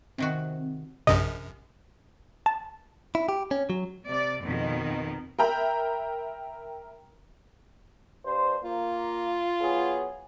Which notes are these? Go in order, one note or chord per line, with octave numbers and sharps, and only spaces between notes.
C3 D#3 C4 F#4
A#1 F#2 C3 D#5
A5
E4
G4
C#4
F#3
C3 D5
F2 B2 D#3
A#4 E5 G5 A#5 B5
G2 C5
A#3 F4
F#3 B3 G#4